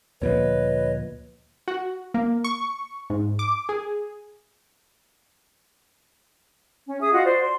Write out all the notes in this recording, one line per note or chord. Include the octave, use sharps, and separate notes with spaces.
D2 A#2 F3 B4 C#5 D#5
F#4
A#3
C#6
G#2
D6
G#4
C#4
G#4 E5 D#6
F4 F#4 D#5 F#5
C5 D5
C6